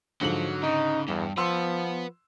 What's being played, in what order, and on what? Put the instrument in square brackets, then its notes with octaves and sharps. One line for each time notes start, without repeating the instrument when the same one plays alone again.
[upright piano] G#2 D3 F#7 [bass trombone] F3 [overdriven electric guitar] F#3
[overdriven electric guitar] C#3 [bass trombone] D#4
[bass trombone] E2 [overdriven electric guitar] G2
[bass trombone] F3 [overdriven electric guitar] B4 F#5 [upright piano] C6 E6